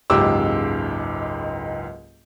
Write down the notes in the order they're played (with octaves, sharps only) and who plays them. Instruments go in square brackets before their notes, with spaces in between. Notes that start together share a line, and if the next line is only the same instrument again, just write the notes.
[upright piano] F#1 C#2 G#2 G4 D6 E6